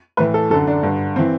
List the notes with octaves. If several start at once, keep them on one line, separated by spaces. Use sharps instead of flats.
A2 E3 B4
A4
F#2 D3 A4
D4
G2 D3
E3 C4